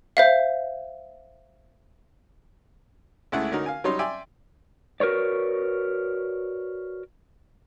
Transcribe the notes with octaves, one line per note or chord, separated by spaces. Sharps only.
C5 E5 F5
C#2 G#3 A3 E4 G#4 F#5
D3 C#4 D#4 F#4 A#4
F5 G#5
F#3 G3 D#4 C#5 C6
D5 E5 G5 G#5 C6
F#4 A#4 B4 C#5 D5